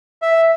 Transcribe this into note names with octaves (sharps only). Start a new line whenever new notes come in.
E5